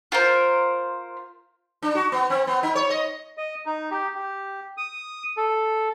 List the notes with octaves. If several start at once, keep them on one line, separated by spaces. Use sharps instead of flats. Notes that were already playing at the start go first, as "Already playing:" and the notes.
F4 A#4 C5
D4
F#4
B3
C4
B3
D#4
C#5
D#5
D#5
D#4
G4
G4
D#6
A4